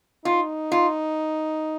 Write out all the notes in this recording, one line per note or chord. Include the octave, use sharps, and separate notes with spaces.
D#4 F4
F4